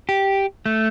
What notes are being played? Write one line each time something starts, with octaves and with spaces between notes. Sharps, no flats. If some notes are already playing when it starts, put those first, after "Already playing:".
G4
A3